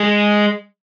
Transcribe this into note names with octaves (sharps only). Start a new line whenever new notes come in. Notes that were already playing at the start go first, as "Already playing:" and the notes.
Already playing: G#3